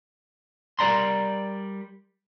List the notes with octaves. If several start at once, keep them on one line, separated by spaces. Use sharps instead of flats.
G3 A#4 D5 A#5 C6